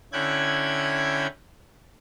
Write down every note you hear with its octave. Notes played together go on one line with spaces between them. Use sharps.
D3 C#4 E4 G5 F#6 G#6